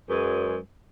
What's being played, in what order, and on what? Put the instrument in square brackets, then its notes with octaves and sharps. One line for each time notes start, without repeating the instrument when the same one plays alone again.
[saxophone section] F#2 F#3 G#3 G#4 B4